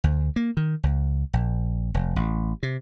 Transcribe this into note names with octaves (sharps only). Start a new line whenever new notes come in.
D2
A#3
D#3
C#2
A#1
F1
A1
C3